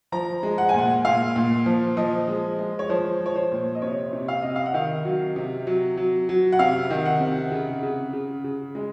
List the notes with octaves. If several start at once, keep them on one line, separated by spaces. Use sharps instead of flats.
F3 A#5
G#3
F#5
G#5
A#2 F#5
A#2 F5
A#2
F3
F3 D#5
G#3
G#3
C#5
F3 C5
F3
C#5
C5
A#2
D#5
C3 C#5
C3
F5
C3 D#5
F5
F#5
D#3 F5
F#3
C3
F#3
F#3
F#3
F#5
C3 F5
D#3
F#5
C3
C#3
C#3
C#3
C#3
G#3